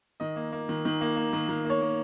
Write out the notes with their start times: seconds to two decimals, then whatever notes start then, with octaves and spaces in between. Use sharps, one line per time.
0.20 D#3 D#5
0.36 A#3
0.52 A#3
0.69 D#3
0.85 D#3
1.01 A#3
1.16 A#3
1.33 D#3
1.49 D#3
1.65 A#3 C#5
1.81 A#3